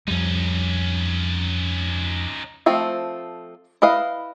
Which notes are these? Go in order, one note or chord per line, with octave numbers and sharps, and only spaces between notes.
F2 G3 C#4 D#4
F3 A3 C4
E4 B4 D#5 F5